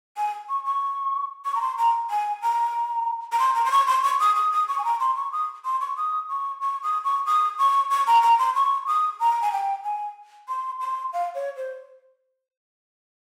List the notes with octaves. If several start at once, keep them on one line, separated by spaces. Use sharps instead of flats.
G#5
C#6
C#6
C#6
A#5
C6
A#5
G#5
A#5
A#5
C6
A#5
C6
C#6
C6
C#6
D#6
D#6
D#6
C#6
G#5
A#5
C6
C#6
D#6
C6
C#6
D#6
C#6
C#6
D#6
C#6
D#6
C#6
C#6
A#5
A#5
C6
C#6
D#6
A#5
G#5
G5
G#5
C6
C6
F5
C#5
C5